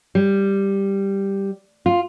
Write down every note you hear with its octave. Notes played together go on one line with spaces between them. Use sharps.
G3
F4